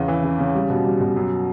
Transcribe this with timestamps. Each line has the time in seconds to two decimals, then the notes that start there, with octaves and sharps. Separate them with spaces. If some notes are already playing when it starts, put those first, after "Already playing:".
Already playing: E2 C#3
0.08 E3
0.24 C#3
0.39 C#3
0.55 G3
0.70 B2
0.85 G3
1.00 B2
1.16 F#2